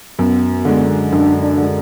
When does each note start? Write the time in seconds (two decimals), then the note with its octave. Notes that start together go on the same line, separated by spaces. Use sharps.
0.19 F#2 B3
0.65 D3 G#3
1.12 F#2 D4
1.43 D4
1.57 D3 G#3